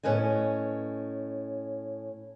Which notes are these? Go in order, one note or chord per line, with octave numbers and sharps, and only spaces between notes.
A2 C#4 B4 D#5 G#5